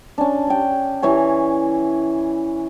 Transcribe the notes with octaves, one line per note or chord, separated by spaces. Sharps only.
C#4 D4
C#5 G5
E3 C#4 C#5 G#5